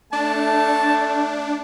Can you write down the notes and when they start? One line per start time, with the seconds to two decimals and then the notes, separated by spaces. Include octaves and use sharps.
0.13 A3 D4 A5